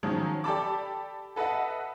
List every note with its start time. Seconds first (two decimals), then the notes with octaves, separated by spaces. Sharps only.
0.03 D#3 F3 F#3 C#4 G#4
0.44 G4 A4 D5 A5 B5 D6
1.36 A4 B4 D#5 E5 F#5